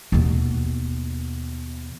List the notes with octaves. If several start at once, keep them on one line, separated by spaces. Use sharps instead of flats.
D#2 B2